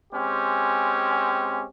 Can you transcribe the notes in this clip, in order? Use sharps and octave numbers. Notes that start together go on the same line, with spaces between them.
G#3 C4 C#4 G4